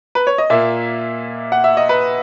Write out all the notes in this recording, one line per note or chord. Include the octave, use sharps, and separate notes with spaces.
B4
C#5
D#5
A#2 A#3 E5
F#5
E5
D#5
B4